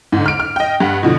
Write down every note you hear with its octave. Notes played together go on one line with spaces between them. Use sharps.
G#2 D3
F6 D7
F6
D#5 G5
G2 F#5
B2 D3 F3